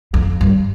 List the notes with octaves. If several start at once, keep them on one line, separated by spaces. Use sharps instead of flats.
F2
G2